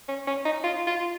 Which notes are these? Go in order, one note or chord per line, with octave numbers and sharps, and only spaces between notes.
C#4
C#4
D#4
F4
F4